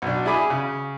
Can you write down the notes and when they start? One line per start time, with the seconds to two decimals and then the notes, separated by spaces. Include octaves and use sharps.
0.02 B1 D4
0.25 E4 G#4 G#5 B5 D6
0.50 C#3